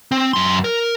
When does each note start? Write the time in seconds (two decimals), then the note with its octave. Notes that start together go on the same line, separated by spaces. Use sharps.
0.11 C4
0.33 F#2 C6
0.64 A#4